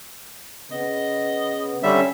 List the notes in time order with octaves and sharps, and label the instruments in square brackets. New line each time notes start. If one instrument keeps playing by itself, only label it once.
[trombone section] C#3 B3 [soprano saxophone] D#5
[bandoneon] D3 G3 E5 [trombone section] C#4